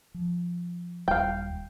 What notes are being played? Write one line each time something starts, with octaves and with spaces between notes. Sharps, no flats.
F3
D#1 G3 F5 G5